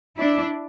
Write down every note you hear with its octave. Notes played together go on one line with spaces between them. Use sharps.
D4 E4